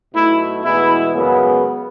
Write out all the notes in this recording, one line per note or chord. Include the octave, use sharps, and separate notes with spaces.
B1 B2 A3 E4
E2 B2 G#3 B3 E4
F#2 C#3 G#3 B3